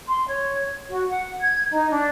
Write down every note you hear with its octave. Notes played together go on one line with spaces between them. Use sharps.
C6
C#5
F#4
F#5
G#6
D#4
D4